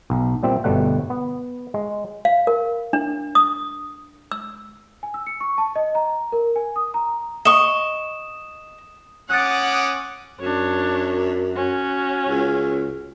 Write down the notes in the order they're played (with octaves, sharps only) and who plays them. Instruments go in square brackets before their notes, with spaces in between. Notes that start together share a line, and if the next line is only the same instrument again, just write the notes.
[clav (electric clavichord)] B1
A#2 G3 C4 E5
G1 B2 G3 A3 F#5
B3
G#3
[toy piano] F5
A#4
D4
D#6
E6
[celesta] G#5
E6
C#7
C#6
A5
D#5
A#5
A#4
G#5
D#6
A#5
[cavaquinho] D#5 C#6 [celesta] D#6 E7
[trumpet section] C#4 D6 D#6 [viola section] F#5 [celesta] F#6 A6
[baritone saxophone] F#2 [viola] D4 C#5
[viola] C#4 F#4
[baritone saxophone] C#2